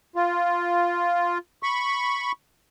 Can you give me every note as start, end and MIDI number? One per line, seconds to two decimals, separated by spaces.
0.16 1.38 65
1.63 2.32 83
1.63 2.32 85